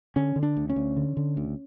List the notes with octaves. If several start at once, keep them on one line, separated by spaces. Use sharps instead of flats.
D3 C#4
D3
D4
D2
C#4
D2
D3
D3
D2